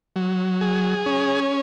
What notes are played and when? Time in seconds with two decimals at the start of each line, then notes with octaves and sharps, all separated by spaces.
0.16 F#3
0.61 G#4
1.06 C#4